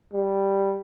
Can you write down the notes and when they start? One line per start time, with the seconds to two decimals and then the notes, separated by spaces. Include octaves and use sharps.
0.13 G3